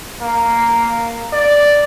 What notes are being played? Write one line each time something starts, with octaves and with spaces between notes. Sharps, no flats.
A#3
D5